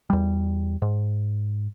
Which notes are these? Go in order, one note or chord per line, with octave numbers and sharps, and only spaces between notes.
E2 G3
G#2